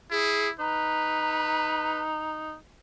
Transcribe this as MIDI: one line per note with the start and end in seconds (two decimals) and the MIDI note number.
0.11 0.52 64
0.11 0.49 68
0.60 2.56 63
0.60 2.03 71
0.60 2.30 82